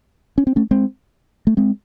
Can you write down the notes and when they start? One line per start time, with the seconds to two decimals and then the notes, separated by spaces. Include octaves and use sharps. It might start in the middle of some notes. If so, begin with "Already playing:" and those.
0.38 C#4
0.47 C4
0.56 A3 C#4
0.71 G#3 C4
1.47 A3
1.57 G#3 C4